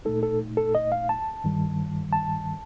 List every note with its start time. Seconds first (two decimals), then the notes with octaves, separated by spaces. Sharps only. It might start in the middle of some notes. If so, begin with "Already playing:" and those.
0.05 A#2 A3 D#4 A4
0.23 A4
0.57 A4
0.75 D#5
0.92 F5
1.09 A5
1.44 G2 D#3 G3
2.13 A5